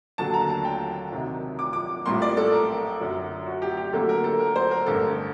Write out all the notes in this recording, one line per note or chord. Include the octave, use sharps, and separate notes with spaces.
D#2 D3 F#3 A5
A#5
A5
G5
C2 C3 D#3 F#3
D6
D6
A#1 A2 G3 A#3 C6
D5
A4
A#4
F#2 D3 F#3
F#4
G4
G4
D2 D3 F#3 A#3 A4
A#4
A4
A#4
C5
A#4
A1 G2 D3 A4